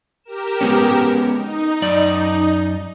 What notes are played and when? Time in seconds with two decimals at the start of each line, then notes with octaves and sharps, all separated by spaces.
0.23 G4 A#4 E7
0.61 G#3 B3 C#4
1.36 D#4
1.82 F#2 D5